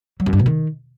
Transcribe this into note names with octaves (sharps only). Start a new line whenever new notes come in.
F#3
F#2
G2
B2
D#3